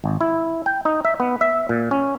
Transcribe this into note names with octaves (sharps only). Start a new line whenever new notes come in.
G#1
E4
G5
D#4
E5
B3
E5
A#2
C#4